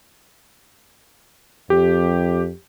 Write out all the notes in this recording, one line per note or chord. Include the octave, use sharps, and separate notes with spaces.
F2 G4